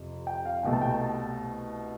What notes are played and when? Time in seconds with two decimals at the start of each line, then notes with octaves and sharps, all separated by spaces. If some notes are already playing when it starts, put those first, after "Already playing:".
Already playing: F2 C3 F3
0.27 G5
0.45 F5
0.63 C2 B2 A3 G5
0.73 A5
0.81 G5
0.91 A5